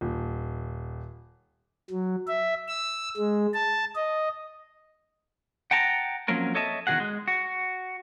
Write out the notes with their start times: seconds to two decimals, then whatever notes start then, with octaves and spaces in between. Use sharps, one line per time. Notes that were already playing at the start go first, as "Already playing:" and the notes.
0.01 D#1
1.90 F#3
2.27 E5
2.68 E6
3.17 G#3
3.54 A5
3.95 D#5
5.71 F#5 G5 A5 A#5
6.28 F3 F#3 A#3 C4 C#4 A#4
6.55 A4 C#5 D#5 E5 A5
6.87 E2 D#3 E3 F#4 G#4 F#5
7.00 G#3
7.28 F#4